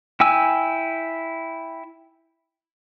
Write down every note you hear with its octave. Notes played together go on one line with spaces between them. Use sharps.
E4 G5 G#5 E6